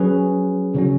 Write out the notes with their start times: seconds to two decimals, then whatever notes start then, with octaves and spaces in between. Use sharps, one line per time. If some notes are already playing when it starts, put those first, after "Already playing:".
Already playing: F#3 C#4 G#4 B4
0.75 C#3 F#3 C#4